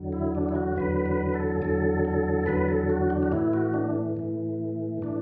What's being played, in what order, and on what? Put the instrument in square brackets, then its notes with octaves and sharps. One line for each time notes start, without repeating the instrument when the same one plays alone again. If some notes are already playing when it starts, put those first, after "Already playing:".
Already playing: [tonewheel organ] E2 D3 F#3
E4
D4
E4
F#4
E2 D3 F#3 B4
B4
A4
E2 D3 F#3 A4
A4
E2 D3 F#3 B4
A4
F#4
D4
F#4
A2 E3 E4
F#4
D4
A2 E3
A2 E3 D4